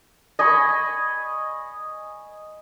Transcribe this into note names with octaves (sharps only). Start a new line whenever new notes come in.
D#5 G#5 B5 C#6